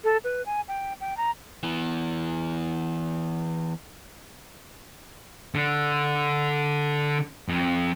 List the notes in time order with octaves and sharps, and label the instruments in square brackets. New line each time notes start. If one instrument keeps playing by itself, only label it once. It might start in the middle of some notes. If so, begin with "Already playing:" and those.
[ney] A4
B4
G#5
G5
G5
A#5
[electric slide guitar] E3 B3
[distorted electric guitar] D3
F2